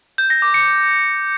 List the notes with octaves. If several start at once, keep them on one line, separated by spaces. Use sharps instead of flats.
G6
A#6
D6
C#7